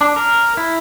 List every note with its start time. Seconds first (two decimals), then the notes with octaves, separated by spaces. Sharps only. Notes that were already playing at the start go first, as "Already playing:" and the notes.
0.01 D4
0.16 A#4
0.57 E4